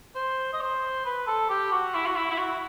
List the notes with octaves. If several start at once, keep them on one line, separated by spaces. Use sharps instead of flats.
C5
D#5
C5
B4
A4
G4
F#4
E4
F#4
E4
E4
F#4